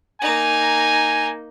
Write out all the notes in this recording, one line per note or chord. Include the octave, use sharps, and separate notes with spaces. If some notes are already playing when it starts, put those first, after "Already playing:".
A#3 D#4 G#5